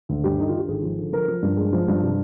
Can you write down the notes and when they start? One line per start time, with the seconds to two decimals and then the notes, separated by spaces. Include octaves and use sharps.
0.09 D2
0.24 G2 G4
0.39 D3 D#4
0.49 F4
0.54 D3
0.59 G4
0.68 G#1 G#4
0.83 F3
0.98 D3
1.13 F3 A#4
1.28 F3
1.42 G2
1.57 G#3
1.73 F3
1.88 G2
2.02 C3